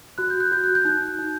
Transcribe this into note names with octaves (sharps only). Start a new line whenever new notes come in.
F#4 F#6
G6
F#6
F#4 G6
F#6
G6
D#4 F#6
G6
F#6
D#4 G6